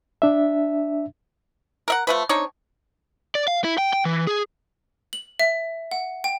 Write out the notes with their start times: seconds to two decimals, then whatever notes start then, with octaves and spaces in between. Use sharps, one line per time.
0.22 D4 E5
1.88 A#4 E5 F#5
2.07 F3 A3 B4
2.29 C4 D4 D#4 C#5
3.35 D5
3.48 F5
3.64 E4
3.78 G5
3.93 G5
4.05 E3
4.27 G#4
5.13 F#7
5.39 E5
5.91 F#5
6.24 G5